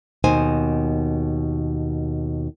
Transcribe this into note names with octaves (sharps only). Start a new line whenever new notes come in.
D#2 B2 D#4 C5 G#5